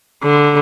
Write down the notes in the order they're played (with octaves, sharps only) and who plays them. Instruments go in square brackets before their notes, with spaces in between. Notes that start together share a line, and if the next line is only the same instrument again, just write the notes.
[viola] D3